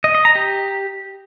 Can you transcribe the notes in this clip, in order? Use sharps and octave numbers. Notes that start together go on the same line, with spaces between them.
D#5
D#5
A#5
G4